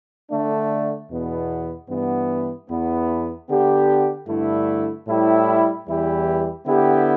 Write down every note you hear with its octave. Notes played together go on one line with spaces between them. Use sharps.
D3 A3 D4
E2 B2 B3
G2 E3 B3
E2 E3 B3
D3 B3 G4
G2 D3 A3 E4
A2 G3 E4
E2 E3 G3 E4 G4
D3 B3 E4 G4